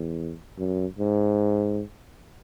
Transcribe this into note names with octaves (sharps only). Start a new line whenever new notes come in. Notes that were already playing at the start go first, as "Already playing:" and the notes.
Already playing: E2
F#2
G#2